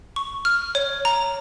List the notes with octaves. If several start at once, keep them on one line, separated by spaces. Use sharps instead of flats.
C#6
F6
C#5
A#5